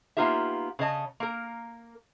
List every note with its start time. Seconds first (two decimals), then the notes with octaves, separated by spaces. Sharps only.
0.17 A#3 B3 D#4 F4 G4 E5
0.79 C#3 C#5 D#5 A5
1.20 A#3 A#4